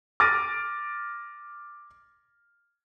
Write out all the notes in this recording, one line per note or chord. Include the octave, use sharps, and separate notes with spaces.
D6 F6 A6 A#6 D7 D#7